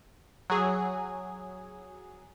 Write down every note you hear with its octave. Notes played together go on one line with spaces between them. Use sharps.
F#3 G#4